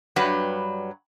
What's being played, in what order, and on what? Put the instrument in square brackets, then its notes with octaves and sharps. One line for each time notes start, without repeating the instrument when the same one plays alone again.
[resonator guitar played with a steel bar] G2 F#3 G3 B4 F#5